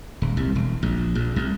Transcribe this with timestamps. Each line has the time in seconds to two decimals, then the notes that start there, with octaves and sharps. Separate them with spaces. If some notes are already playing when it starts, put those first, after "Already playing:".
0.22 D#1
0.37 C2
0.55 E1
0.83 A#1
1.15 A#1
1.36 C2